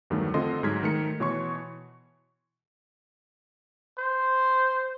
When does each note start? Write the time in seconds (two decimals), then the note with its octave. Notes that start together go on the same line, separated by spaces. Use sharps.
0.10 E2 G2 D#3 F#3 A3
0.34 D3 C4 F4 A4 D#5 C6
0.63 G#2 F#3 G#3 F6 G#6 B6
0.83 D#3 A3 A#4 C#7
1.20 B2 E3 C#5 C6 C#6 C#7
3.99 C5